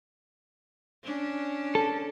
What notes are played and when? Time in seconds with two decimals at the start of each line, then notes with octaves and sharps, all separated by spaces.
1.04 C#4 D4
1.75 A4